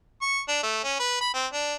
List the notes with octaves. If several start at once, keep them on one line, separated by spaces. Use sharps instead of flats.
C#6
D4
A3
C#4
B4
B5
C4
D4